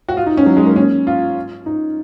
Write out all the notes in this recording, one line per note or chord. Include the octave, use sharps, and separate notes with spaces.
F#4
F4
D#4
C#4
F#3
G#3
A#3
C#4
F4
D#4